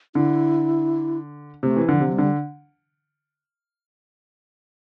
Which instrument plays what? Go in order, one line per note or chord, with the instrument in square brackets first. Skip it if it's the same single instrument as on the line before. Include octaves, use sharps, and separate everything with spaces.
[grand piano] D3 [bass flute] E4
[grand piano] C3 [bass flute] A3
[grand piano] E3
[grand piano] D3 [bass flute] F3
[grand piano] C3
[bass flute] F3
G3
[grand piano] D3